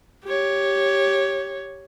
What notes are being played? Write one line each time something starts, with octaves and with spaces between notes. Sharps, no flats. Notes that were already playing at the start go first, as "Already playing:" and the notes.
G4 C#5